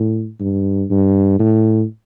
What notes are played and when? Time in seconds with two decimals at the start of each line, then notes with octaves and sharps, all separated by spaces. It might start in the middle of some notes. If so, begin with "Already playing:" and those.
Already playing: A2
0.40 G2
0.90 G2
1.39 A2